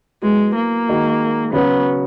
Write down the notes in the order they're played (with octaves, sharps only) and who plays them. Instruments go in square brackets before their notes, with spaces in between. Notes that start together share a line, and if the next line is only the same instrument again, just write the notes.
[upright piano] F#3 B3 E4 [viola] G#3
[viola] A#3
[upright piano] D#3 G#3 D#4 F#4
[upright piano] C#3 F#3 C#4 F#4 [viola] B3